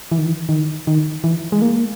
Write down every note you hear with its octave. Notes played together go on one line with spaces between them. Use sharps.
E3
D#3
E3
D#3
D#3
E3
G#3
A#3